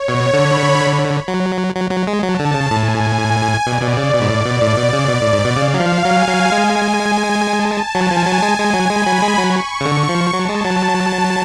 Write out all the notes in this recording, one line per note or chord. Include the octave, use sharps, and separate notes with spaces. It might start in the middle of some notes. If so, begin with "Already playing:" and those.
Already playing: C#5
B2
D3 B5
F#3
F#3
F#3
G#3
F#3 A5
D3
C#3
A2 G#5
G#5
B2 D5
B2
C#3
B2
G#2
A2
B2
A2 D5
B2
C#3
B2
A2
G#2
B2
C#3 F5
F#3
F3
F#3 G#5
F#3
G#3
A5
F#3 G#5
F3
F#3
G#3
G#3
F#3
G#3 B5
F#3
G#3
F#3 C#6
C#3
D3 C#6
F3
F#3 A5
G#3
F#3